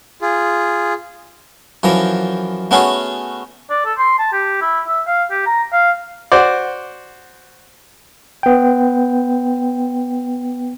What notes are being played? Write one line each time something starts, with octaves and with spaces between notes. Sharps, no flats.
F4 G#4
F#2 E3 F3 A#5
A3 B3 C#4 F#4 G#4 C#5
D5
A4
C6
A5
G4
E4
E5
F5
G4
A#5
F5
F#4 C5 D5
B3 G5